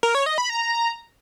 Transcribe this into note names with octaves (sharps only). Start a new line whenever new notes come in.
A#4
C#5
D#5
B5
A#5